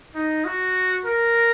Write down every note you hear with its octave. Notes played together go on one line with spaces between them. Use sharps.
D#4
F#4
A#4